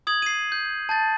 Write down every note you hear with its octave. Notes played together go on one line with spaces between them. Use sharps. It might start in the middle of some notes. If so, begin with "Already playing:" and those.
D#6 G#6 F#7
C7 D#7
G6
A5 G6 A6